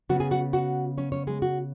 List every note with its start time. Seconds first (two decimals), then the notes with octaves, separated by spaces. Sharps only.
0.09 C#3 B3 F#4 F#5
0.20 G#4 G#5
0.31 F#4 F#5
0.53 F#4 F#5
0.98 C#4 C#5
1.12 C#4 C#5
1.27 G#3 G#4
1.42 F#4